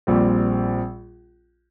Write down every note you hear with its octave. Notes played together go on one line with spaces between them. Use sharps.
A#1 A#2 G3 C4